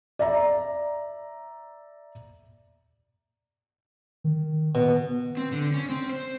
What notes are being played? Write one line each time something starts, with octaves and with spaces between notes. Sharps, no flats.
D5 E5 A#5
D#3
B2
C4
D3
C#4
C4
C5